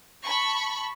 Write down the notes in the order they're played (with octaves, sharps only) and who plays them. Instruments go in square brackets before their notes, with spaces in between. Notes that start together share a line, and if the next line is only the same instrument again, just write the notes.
[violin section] A5 B5 C#6